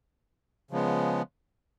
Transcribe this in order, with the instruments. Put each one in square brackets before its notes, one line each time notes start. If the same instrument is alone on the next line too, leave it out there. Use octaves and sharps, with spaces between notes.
[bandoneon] C#3 F3 G#3 B3